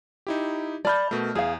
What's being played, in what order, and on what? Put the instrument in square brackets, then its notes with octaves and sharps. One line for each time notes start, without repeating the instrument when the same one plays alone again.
[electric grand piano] D#4 E4 G4
[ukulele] D5 B5 [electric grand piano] A5 F6 G6
[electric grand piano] B2 A3 [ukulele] A#4
[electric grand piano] E2 [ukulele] G#4 F5